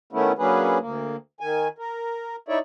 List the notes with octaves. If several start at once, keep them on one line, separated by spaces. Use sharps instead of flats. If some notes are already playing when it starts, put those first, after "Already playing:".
D#3 A3 B3 C#4 E4
F#3 A#3 C#4 D4 G#4 B4
D2 A#3
D#3 G#5
A#4
D#4 E4 C#5 D5 E5